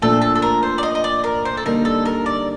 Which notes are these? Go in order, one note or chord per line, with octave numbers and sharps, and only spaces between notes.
A#2 F3 A3 D4 A4
A4
A4
A#4
C5
D5
D#5
D#5
D5
A#4
C5
A4
D3 G3 A#3 D#4 A#4
A4
A#4
D5